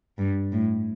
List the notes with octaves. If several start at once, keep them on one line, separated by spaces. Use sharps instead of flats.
G2
A2